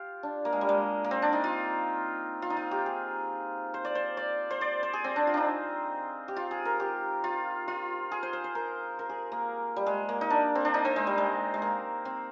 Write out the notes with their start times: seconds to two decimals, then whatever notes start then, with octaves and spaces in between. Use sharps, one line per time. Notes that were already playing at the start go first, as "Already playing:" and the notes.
Already playing: F4 G4
0.23 D4
0.45 A#3
0.53 G#3
0.61 G3
0.69 G#3
1.04 A#3
1.11 C4
1.22 D4
1.33 D#4
1.44 F4
2.42 F4
2.50 D#4
2.57 F4
2.71 G4
2.86 G#4
3.74 C5
3.85 D5
3.95 C5
4.17 D5
4.51 C5
4.61 D5
4.83 C5
4.93 G#4
5.04 C4
5.16 D4
5.27 F4
5.34 D4 D#4
6.28 G4
6.36 F4
6.51 G#4
6.65 A#4
6.80 G4
7.24 F4
7.68 F4
8.12 G#4
8.23 C5
8.33 C5
8.44 C5
8.55 A#4
8.99 A#4
9.09 G#4
9.32 A#3
9.76 G3
9.87 G#3
10.09 A#3
10.21 D#4
10.30 D4
10.55 C4
10.65 D4
10.74 D#4
10.85 C4
10.96 G#3
11.07 G3
11.18 G#3
11.54 G#3
11.62 A#3
12.05 C4